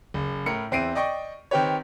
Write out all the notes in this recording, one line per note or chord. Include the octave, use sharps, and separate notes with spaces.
F#1
A2 A#4 C#7
E2 C4 E4 C7 D7 D#7
D5 D#5 G5 C#6
D#3 C4 G4 B4 C#5